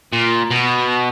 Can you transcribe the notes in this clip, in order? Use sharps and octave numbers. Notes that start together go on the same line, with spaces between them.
A#2
B2